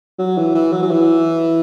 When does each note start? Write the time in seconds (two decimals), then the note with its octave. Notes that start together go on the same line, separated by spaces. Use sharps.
0.19 F#3
0.38 E3
0.55 E3
0.72 F#3
0.82 F#3
0.91 E3